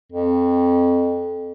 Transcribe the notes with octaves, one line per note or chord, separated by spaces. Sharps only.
F2